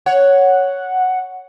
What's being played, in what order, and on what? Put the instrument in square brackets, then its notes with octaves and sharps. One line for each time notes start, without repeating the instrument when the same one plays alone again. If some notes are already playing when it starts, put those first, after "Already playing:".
[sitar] C#5 [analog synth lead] F#5